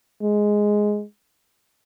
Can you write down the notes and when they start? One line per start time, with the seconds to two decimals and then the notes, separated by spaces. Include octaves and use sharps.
0.22 G#3